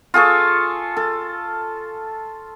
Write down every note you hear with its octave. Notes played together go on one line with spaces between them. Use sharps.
F4 G#4 A4 C#6
A4